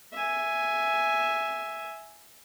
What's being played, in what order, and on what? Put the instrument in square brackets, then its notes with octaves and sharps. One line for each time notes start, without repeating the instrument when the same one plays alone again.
[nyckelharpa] E5 G#5